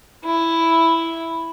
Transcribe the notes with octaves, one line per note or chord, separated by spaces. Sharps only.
E4